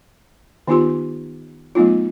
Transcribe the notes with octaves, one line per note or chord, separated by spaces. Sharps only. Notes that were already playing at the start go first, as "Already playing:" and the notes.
D#3 B3 D#4 F4 G4 C6
F#3 A3 B3 D#4 F4